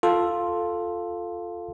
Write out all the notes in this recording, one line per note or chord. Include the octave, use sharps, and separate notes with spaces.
F4 A4